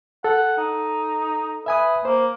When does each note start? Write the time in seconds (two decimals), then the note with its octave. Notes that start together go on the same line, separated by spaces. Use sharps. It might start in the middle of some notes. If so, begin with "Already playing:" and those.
0.24 A4 F#5
0.58 D#4
1.66 B4 E5 G#5 D#6
2.05 A#3 C5